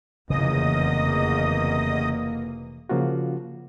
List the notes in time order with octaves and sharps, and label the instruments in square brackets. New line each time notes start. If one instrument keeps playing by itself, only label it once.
[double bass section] F1 E3 A#3 [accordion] E2 D#5 D#6 [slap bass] C#3
[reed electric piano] C#3 F3 A#3 F4 F#4